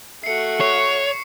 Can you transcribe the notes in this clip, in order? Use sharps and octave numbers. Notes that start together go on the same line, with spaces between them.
A3 F#4 C7 C#7
C#5 C#6 C7